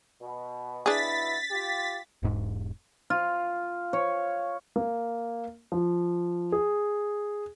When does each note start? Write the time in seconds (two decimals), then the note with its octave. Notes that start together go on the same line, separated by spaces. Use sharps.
0.21 B2
0.86 B1 B3 D4 E4 G#4 A6 B6
1.51 F4 G4
2.23 E1 G#2
3.10 F4
3.93 C#5
4.76 A#3
5.72 F3
6.52 G#4